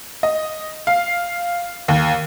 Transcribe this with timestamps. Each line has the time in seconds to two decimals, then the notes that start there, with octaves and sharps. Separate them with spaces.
0.23 D#5
0.87 F5
1.88 D#2